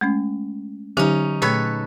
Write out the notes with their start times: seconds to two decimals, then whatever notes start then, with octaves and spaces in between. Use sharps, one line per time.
0.01 G#3 A3 C#4
0.97 D3 F#3 C#4 D#4 G4
1.42 A#2 A3 A4 B4 C#5